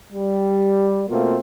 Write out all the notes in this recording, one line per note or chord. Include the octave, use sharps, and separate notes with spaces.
G3
B2 A3 A#3 C4 F4